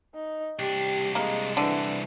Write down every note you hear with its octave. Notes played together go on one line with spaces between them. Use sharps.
D#4
C2 D4 G4
G#3 A#3
D3 E3